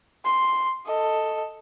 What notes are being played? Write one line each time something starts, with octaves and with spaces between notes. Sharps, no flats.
C6
A4 D#5